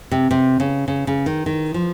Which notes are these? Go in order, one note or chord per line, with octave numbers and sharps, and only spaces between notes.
C3
C3
C#3
C#3
C#3
D#3
D#3
F3